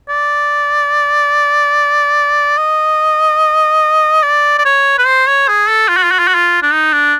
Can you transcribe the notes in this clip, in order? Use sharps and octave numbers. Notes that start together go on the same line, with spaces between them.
D5
D#5
D5
D5
C#5
B4
C5
C#5
G#4
A4
F4
F#4
F4
F#4
F4
F#4
F4
D4
D#4
D4